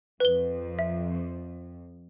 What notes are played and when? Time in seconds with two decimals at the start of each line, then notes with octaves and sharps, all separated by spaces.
0.20 F2 B4 G7
0.79 E5